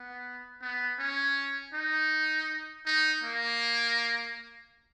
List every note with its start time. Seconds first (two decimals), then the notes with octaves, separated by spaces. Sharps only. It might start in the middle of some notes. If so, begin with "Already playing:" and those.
Already playing: B3
0.62 B3
0.99 C#4
1.74 D#4
2.86 D#4
3.24 A#3